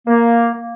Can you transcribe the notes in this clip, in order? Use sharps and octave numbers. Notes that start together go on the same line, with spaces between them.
A#3
A#3